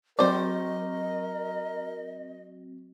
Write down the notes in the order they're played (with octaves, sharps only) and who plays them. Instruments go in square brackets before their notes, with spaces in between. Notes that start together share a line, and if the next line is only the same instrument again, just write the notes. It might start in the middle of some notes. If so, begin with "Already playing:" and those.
[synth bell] F#3 C4 F#4 [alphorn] A#4 [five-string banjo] C5 D5 [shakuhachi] D#5